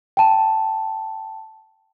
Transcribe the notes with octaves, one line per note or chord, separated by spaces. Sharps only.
G5 A5